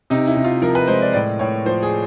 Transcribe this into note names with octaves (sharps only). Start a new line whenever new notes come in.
C3 D#4
E4
C3
F4
F3 A#4
B4
G#3 C5
D5
A2 D5
A2 C#5
F3 C5
G#4